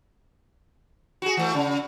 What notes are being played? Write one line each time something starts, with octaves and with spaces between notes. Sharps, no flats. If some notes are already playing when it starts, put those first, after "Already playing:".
F#4 G#4
E3 A3
C#3